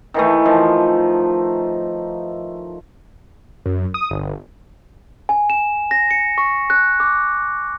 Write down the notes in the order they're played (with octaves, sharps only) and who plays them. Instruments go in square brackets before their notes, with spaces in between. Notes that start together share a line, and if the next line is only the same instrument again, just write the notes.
[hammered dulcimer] D#3 E3 A3
D#3 F3
[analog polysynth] F#2
D#6
G1
[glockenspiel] G#5
E7
A#6
C#7
C#6
F#6
D6